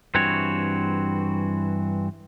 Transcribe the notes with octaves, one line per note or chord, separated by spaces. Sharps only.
G2 E3 C4 F#4 C#5